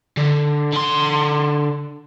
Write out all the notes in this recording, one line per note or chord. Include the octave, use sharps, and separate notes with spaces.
D3
D3 C6